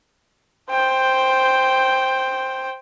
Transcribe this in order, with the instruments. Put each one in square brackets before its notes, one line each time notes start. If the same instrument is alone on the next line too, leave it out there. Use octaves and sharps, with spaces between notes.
[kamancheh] C5 G5